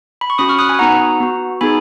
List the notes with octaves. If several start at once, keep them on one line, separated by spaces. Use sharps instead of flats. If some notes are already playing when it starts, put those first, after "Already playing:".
B5
C#6
C#4 F#4 B5 D#6
C#6 F6
D#6 F#6
G#5 B5
B3 D#4 F#4 F#5 A#5
B3 F#4
B3 D#4 G#4 G#5 B5